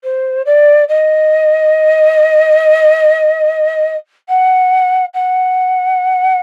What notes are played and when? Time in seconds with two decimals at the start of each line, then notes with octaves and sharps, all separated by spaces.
0.04 C5
0.46 D5
0.89 D#5
4.29 F#5
5.14 F#5